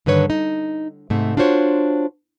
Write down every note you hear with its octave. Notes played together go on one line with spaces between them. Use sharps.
G2 D3 D#3 B4 C#5
D#4
G#2 C3 A3
D4 F4 F#4 C5 C#5